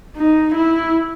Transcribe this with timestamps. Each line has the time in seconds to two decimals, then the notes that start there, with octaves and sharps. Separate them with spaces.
0.16 D#4
0.55 E4